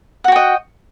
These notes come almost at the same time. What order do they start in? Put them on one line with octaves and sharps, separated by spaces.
F#5 F#4 G5 D#5